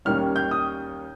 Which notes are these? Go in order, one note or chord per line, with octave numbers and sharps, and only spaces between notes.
D#2 D#3 G3 C#4 F6
G6
D#6